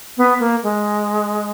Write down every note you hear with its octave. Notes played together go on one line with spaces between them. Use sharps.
B3
A#3
G#3